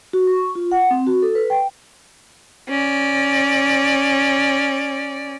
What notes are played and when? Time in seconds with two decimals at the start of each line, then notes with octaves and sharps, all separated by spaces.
0.13 F#4
0.27 C#6
0.55 F4
0.72 F#5
0.90 C4
1.07 F#4
1.22 A4
1.35 B4
1.50 G5
2.69 C#4 D5